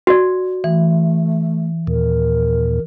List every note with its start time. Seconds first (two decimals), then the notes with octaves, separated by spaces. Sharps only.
0.07 F#4 D5
0.64 E3 A3
1.87 D#2 A#2 A#4